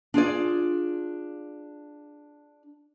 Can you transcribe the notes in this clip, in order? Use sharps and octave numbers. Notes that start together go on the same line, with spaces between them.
D4 F4 G#4 D5